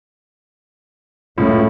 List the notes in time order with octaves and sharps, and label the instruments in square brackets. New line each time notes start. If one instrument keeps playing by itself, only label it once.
[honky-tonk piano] C#2 F#2 [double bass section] A2